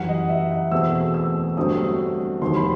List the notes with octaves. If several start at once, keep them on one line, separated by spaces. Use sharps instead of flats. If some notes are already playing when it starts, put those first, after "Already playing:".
Already playing: F#2 E3 G3 F#5
D#5
E5
F#5
E2 B2 A3 C4 E6
E6
G1 G2 F#3 A3 C4 D#6
E1 D#2 D#3 F#3 C6
B5